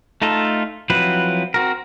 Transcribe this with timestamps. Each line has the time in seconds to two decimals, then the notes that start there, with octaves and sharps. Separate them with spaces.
0.22 A3 D#4 F4 A4
0.90 F3 F#3 C4 E4 B4
1.54 C4 F#4 A#4